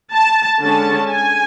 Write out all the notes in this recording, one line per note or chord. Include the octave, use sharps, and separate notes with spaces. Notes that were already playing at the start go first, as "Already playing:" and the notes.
A5
D3 G#3 C#4 A5
G#5